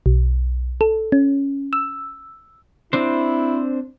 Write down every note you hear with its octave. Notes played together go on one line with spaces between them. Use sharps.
B1
A4
C#4
E6
C4 D4 E4 C5